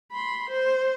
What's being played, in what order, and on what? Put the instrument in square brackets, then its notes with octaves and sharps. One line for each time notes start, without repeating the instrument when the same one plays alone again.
[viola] B5 C6
C5